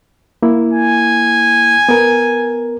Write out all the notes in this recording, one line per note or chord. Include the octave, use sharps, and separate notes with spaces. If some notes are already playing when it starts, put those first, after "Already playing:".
A#3 E4
G#5
B3 A#4